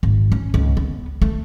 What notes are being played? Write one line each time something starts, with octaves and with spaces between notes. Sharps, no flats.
G#1
C#4
C#2
B3
A3